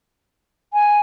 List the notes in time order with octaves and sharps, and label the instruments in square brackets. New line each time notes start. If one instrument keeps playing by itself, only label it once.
[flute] G#5